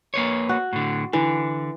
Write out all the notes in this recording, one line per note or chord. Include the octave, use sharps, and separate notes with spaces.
A#3 B4 C#5
F#4
A2 D3
D3 E3